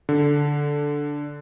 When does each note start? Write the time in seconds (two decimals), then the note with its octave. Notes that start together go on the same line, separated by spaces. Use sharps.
0.09 D3